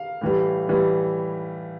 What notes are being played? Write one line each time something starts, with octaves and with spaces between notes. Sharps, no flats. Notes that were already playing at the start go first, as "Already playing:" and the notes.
Already playing: F5
A2 E3 G3
A2 E3 G3